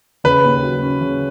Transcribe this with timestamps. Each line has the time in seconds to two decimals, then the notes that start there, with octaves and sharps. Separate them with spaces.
0.24 C#3 B4
0.44 D#2
0.63 F#3
0.82 C#4
1.01 C#3